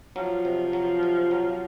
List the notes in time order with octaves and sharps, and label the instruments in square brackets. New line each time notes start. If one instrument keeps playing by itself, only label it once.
[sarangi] F3 [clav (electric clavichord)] F#3
[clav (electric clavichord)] C3
F#3
C3
F#3